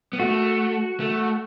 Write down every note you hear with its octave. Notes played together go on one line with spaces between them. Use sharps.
B3
A3 F#4
A3